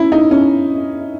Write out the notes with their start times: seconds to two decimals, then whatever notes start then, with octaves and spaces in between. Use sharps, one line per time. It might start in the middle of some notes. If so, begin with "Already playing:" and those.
Already playing: C#4 E4
0.12 D#4
0.31 C#4